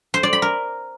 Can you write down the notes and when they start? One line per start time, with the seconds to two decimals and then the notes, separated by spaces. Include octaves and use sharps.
0.14 C5
0.23 D5
0.33 B5
0.42 A#4